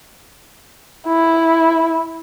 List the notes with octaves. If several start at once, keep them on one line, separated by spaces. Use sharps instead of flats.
E4